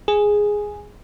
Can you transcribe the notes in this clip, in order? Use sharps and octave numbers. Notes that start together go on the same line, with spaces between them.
G#4